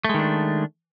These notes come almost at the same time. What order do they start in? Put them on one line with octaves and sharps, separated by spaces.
A3 G#3 D#3 D4